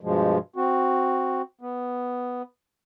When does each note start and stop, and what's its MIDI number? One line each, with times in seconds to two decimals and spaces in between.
0.01 0.38 43
0.01 0.38 47
0.01 0.38 53
0.01 0.38 56
0.56 1.42 60
0.56 1.42 66
1.61 2.42 59